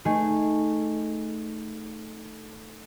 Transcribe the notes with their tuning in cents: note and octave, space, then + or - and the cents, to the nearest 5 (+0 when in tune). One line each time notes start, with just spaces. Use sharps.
A3 +0 D#4 +0 G#4 -10